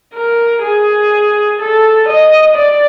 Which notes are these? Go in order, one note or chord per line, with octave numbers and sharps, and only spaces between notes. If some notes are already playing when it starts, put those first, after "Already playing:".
A#4
G#4
A4
D#5
D5